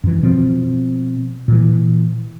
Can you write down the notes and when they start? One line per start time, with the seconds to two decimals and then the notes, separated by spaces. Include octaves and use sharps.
0.04 F#2 E3
0.23 B2 F3 C4
1.48 A#2 E3